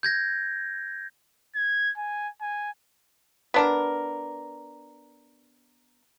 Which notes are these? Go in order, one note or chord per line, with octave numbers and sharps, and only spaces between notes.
G6 G#6 A#6
G#6
G#5
G#5
B3 D4 A#4